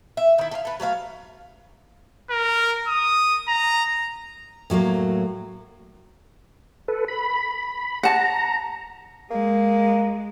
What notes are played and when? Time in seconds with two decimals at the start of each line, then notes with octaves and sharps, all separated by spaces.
0.17 E5
0.38 D#3 E4
0.51 A4 F5
0.65 A4 B4
0.80 F#3 A3 C5 F5
2.30 A#4
2.87 D#6
3.48 A#5
4.70 A2 F#3 A3 A#3
6.88 A4 B4
7.08 B5
8.03 F#5 A5 A#5
9.31 G#3 A#3